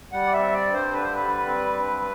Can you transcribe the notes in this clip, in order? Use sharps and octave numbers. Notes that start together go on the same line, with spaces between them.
G3 F#5
D5
E5
C4
D5
G2
C5
D3 B4
C5
B4
G3
C4
G2